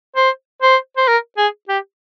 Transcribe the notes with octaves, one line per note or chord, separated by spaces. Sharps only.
C5
C5
C5
A#4
G#4
G4